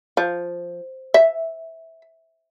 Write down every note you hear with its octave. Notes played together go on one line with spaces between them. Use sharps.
F3
E5